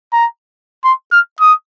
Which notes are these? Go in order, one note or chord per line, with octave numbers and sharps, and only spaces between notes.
A#5
C6
F6
D#6